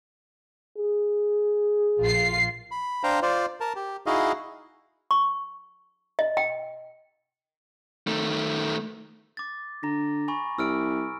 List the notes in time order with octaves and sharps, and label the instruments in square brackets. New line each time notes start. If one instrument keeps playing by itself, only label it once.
[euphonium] G#4
[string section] A#1 F4 C7
[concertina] B5
D4 C5 F5 G5 A#5
F4 C5 D5
A#4 A5
G4
D#4 E4 F#4 G#4 D#5 F5
[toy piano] C#6
D#5
G5
[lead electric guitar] D#3 A3
[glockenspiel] D6 A6
[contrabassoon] D3 [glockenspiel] A#5 A#6
[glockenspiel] G#5 B5 C#6
[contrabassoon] C2 [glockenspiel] E6 F6 D7